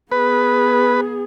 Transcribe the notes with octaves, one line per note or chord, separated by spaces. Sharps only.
B3 G#4 B4